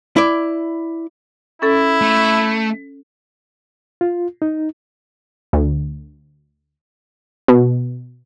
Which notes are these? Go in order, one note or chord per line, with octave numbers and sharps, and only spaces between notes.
E4 D5
C#4 E4 A4
A3
F4
D#4
D2
B2